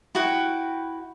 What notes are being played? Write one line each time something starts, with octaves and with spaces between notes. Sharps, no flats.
E4 F#4 B4 G5